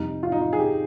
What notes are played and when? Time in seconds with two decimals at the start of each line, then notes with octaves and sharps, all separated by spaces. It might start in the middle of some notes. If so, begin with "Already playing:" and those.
Already playing: F1 F2 D#3 G3 D#4
0.23 F4
0.32 D#4
0.41 F4
0.53 G#4
0.60 G4